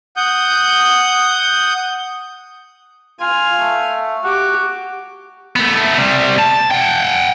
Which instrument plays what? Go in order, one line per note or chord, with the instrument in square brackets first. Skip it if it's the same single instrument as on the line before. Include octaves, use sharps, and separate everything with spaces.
[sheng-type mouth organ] F#5 D#6 G6
[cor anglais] F4 [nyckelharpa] F5 G#5
[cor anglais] A3
[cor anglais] F#4 [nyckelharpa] G4 D6
[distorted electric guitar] A3 B3
C3 G3
A5
F#5 G5